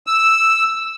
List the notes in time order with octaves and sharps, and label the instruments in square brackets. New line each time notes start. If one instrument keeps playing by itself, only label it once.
[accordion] E6